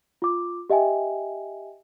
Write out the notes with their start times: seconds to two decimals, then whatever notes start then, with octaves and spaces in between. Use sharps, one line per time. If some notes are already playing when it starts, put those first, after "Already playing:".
0.22 F4 D6
0.70 G4 D#5 E5 G5 G#5